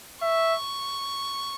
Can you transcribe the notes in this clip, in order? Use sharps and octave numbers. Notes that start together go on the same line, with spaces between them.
E5 C#6